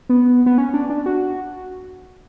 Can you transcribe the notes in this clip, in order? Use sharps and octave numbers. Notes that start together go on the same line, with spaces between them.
B3
B3
C#4
D4
D4
F#4